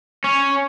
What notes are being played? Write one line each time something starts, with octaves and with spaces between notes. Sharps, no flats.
C#4